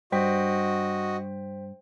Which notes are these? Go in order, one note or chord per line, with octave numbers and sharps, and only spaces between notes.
G2 F#4 C5 D#5 G5 B6